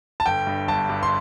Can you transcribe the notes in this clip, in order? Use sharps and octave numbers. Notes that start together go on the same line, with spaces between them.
A5
G1 G5
G2
G1 A5
G2
C6